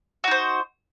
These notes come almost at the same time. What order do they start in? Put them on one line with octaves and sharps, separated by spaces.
F#4 D#4 C5